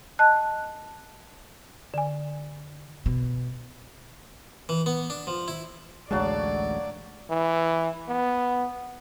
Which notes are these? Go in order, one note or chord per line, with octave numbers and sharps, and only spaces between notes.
D#5 A5 F#6
D3 G#5
B2
E3
B3
D4
F3
E4
A1 D2 F#3 G#3 D5 F5 A5
E3
B3